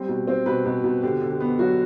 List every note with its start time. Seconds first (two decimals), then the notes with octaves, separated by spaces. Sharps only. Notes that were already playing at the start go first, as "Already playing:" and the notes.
Already playing: G3 C4
0.09 B2
0.27 C4
0.46 B2 B4
0.65 B2
0.84 B2
1.02 D3 G4
1.22 D3
1.31 G4
1.40 B3
1.59 F#3 F#4